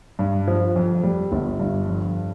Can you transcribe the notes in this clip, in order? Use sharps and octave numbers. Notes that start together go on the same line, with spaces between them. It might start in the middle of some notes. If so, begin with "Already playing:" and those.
G2
F3
F2
G3
G1
G2
F2